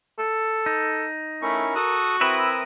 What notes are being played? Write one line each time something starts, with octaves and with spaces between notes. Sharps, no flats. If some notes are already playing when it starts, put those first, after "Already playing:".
A4
D#4
A3 C#4 E4 A#4 C#6
F#4 A4 D#6
C4 E4 A#4 B4 E5 D#6